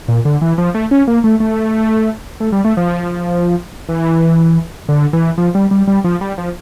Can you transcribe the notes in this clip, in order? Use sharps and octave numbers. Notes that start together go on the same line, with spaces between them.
A#2
D3
E3
F3
A3
C#4
A#3
A3
A3
A3
G3
A3
F3
E3
D3
E3
F3
G3
G3
G3
F3
G3
F3